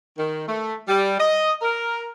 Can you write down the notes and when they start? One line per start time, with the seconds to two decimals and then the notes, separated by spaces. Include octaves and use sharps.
0.18 D#3
0.48 A3
0.88 G3
1.19 D#5
1.62 A#4